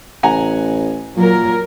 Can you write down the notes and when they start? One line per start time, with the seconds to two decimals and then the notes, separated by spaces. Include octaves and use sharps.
0.23 A1 F#5 G#5 A#5
1.16 A#2 F#3 A#4